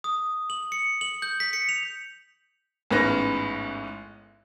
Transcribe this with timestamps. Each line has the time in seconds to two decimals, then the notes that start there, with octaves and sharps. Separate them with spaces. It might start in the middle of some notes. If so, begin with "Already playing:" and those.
0.04 D#6
0.50 F#7
0.72 C#7
1.01 F#7
1.22 G6
1.40 B6
1.53 C#7
1.69 F7
2.91 A1 G#2 B3 C#4 B4 A#6